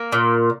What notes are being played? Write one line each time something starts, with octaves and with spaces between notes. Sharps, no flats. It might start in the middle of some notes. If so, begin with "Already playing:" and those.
Already playing: A#3
A#2